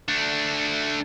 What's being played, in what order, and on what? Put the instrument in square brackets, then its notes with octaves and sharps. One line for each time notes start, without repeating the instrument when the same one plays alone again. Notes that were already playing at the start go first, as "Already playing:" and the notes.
[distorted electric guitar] A3 D4